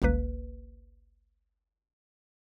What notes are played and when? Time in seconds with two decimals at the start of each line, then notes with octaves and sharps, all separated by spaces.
0.02 G1 C#2 A#3 B4